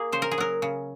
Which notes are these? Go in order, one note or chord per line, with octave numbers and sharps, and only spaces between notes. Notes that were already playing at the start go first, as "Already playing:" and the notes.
Already playing: A#3 G#4
C#3 C5
A#4
G#4
F#3 A#4
C#3